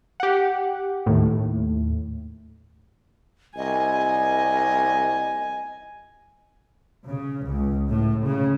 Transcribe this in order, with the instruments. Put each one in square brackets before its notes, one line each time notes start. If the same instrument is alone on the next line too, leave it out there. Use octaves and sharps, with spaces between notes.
[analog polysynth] G4 F#5
D#2 A2
[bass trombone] C2 [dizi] D#5 [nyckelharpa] G#5
[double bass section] C#3
C#2
A2
C#3